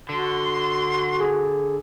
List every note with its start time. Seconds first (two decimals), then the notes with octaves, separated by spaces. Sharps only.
0.09 D3 F#4 C6
1.21 G#4